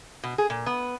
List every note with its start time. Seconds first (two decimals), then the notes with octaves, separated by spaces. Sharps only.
0.24 B2
0.38 G#4
0.50 A#2
0.66 B3